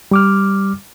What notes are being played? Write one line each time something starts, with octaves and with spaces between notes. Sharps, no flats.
G3 D6 F6